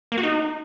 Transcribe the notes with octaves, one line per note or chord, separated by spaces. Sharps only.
A#3
F#4
D#4